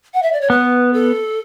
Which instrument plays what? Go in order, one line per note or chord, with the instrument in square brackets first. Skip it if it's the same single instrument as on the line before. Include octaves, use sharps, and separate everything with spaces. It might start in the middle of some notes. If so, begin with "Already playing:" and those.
[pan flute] F#5
E5
D5
C#5
[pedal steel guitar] B3 [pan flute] B4
[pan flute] A4